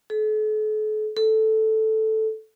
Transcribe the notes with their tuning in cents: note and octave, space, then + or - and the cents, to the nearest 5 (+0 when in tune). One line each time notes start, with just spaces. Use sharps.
A4 -40
A4 -5